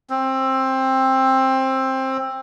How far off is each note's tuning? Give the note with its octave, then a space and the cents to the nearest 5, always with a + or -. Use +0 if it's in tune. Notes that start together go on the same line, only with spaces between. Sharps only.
C4 +15